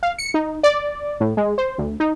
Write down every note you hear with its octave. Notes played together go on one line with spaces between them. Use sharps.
F5
C#7
D#4
D5
A2
G#3
C5
D2
D#4